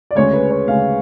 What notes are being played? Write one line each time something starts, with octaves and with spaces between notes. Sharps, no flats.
D5
D2 C#3 G#3 C#5
B4
C#5
D2 C#3 G#3 F5